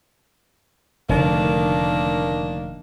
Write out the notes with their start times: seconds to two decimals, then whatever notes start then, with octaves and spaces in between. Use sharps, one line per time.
1.09 F1 A2 D3 D#3 A#3 D4